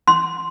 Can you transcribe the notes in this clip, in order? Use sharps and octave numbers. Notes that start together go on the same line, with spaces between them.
C6